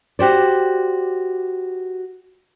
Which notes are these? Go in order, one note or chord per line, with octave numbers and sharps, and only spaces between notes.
F#4 G4 C5 D5